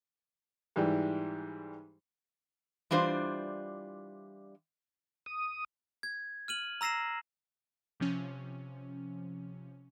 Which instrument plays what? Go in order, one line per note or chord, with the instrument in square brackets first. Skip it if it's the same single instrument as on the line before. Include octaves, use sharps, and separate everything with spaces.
[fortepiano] G#2 E3 G3
[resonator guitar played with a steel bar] E3 G3 D4 F4 C5
[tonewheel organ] D#6
[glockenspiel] G#6
F6 D#7 F#7
A#5 E6 A#6 C7 E7
[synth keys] C3 F3 C#4